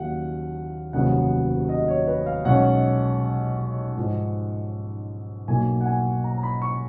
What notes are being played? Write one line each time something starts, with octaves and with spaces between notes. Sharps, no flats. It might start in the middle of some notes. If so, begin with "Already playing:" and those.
Already playing: D#2 C#3 F#3 A#3 C#4 F5 F#5
F1 D#2 C#3 F#3 B3 F#5
D#5
C#5
B4
F5
B1 B2 G#3 C#4 F#5
G#2 F3 G#3 D#4
B1 B2 A#3 G#5
F#5
G#5
A#5
A#5
B5
C#6